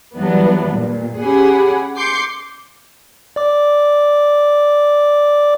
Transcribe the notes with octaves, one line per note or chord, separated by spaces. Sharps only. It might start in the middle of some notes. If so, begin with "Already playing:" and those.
E3 F#3 G3 B3 D4
A#2
C#4 G4 G#4 F#5 G#5 B5
C6 D6 G6 C7 C#7
D5 D6